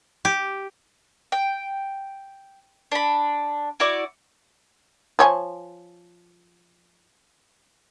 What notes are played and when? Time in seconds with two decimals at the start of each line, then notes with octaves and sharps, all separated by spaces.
0.25 G4
1.32 G5
2.92 D4 B5
3.80 E4 F#4 D5
5.19 F3 C#5 G#5